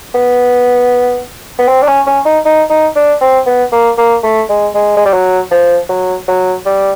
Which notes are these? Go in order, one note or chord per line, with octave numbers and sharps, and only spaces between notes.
B3
B3
C4
D4
C#4
C#4
D#4
D#4
D#4
D4
C4
B3
A#3
A#3
A3
G#3
G#3
G#3
G3
F#3
F3
F#3
F#3
G3